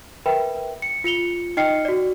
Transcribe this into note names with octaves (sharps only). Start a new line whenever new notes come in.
A#4 B4 E5 G5 B5
C#7
F4 C#7 F7 G7
D#4 D#5 G5 F6 C7 C#7
F#4 D5